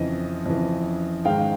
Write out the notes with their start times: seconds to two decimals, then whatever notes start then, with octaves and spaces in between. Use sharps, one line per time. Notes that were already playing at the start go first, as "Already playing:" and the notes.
Already playing: F2 C#3 E3 D#5
0.46 F2 C#3 E3
1.25 G#2 D#3 G#3 F5 G5